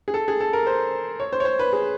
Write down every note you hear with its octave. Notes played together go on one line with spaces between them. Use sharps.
G#4
A4
G#4
A4
A#4
C5
C#5
C5
C#5
C5
B4
G#4